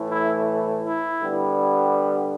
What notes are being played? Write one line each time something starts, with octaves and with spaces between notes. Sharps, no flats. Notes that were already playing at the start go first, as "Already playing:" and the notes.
Already playing: A2 E3 A3
E4
E4
D3 G3 B3